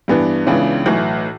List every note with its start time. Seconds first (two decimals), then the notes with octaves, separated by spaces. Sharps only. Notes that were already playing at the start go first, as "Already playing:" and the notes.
0.08 G2 E3 B3 D4
0.46 C#2 C#3 E3 B3 D4
0.86 B1 A2 E3